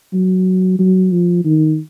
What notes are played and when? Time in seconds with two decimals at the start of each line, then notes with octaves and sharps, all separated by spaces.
0.13 F#3
0.79 F#3
1.12 F3
1.45 D#3